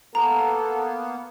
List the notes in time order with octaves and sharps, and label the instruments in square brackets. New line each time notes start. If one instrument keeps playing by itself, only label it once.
[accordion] A#3 B3 [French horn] A4 [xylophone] A#5